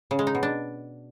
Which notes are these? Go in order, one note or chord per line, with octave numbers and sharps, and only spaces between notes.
C#3
G#3
D#4
B2
D4